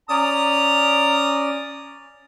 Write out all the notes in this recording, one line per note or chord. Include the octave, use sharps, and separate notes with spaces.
C#4 D5 A#5 D#6